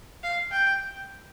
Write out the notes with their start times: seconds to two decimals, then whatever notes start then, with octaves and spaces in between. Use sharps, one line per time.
0.23 F5
0.52 G5